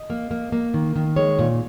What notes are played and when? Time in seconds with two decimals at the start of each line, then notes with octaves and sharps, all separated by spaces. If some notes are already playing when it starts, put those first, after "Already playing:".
Already playing: D#5
0.10 A#3
0.31 A#3
0.52 A#3
0.74 D#3
0.96 D#3
1.16 G#3 C#5
1.39 A#2